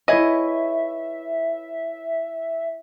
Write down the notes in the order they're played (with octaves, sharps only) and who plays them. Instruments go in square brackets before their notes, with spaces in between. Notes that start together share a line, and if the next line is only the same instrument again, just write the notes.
[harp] E4 B4 C#5 [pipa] G#4 D#5 [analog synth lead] E5